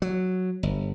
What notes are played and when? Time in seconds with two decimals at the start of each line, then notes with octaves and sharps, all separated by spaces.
0.02 F#3
0.63 G1